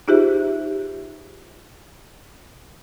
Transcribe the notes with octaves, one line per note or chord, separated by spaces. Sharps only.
D#4 F4 G4 G#4 C5 E5